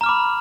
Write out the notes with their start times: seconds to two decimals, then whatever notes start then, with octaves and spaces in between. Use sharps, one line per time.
0.01 A#5
0.04 F6
0.06 D6
0.09 B5